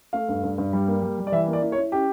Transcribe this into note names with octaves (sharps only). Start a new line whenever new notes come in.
A3 F5
G2
G2
G2
G3
A#3
G3
G3
D5
E3 E5
A#3
D5
E4
C#5
E4
C#4 G4